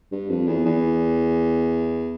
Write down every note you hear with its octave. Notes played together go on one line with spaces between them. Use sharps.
G2
F2
E2
E2